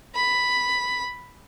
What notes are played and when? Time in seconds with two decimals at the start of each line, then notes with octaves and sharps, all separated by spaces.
0.14 B5